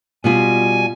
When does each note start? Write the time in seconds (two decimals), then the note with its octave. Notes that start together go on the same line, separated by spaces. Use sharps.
0.24 B2 G3 F4 G#5